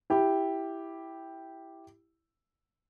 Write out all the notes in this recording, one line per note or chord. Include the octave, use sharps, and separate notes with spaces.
E4 G4